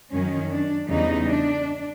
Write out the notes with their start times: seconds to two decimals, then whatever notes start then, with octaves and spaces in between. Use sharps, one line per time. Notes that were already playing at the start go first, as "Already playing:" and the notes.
0.11 F#2 D#3 F#3 C#4
0.50 D4
0.88 E2 C#3 E3 G3 D#4
1.28 D4